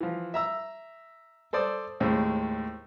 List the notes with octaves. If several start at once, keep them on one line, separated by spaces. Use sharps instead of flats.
E3 F3
E5 A#5 E6
A4 C5 D5 D#6
D#2 A2 G#3 C4